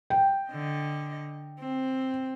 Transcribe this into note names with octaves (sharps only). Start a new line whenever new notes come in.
G5
D3 D#5
C4